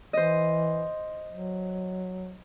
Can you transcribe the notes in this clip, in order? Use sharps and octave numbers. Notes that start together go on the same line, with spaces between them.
E3 C5 D#5
F#3